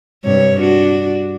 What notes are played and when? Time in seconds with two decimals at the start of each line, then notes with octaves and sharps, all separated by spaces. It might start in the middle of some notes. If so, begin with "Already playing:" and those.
0.24 G2 C3 C#5
0.60 D4 F#4